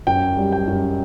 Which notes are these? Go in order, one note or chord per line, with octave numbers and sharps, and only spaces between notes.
F#2 G5
G3
G5
F#2